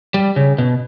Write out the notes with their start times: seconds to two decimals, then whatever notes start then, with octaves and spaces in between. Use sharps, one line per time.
0.14 G3
0.36 C#3
0.58 B2